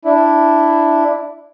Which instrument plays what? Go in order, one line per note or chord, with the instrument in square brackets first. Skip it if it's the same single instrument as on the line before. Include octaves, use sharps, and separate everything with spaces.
[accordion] D4 E4